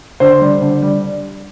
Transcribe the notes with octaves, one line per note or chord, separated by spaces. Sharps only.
D3 C5
G3
D3
G3